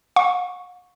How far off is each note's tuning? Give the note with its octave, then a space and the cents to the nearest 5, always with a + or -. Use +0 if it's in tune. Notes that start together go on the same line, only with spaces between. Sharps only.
F#5 -45 C#6 +0